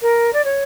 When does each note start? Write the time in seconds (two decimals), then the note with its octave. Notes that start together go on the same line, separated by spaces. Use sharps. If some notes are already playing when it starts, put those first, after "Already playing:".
0.02 A#4
0.33 D5
0.45 C#5